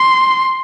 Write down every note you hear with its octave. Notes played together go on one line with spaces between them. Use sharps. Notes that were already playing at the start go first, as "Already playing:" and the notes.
Already playing: C6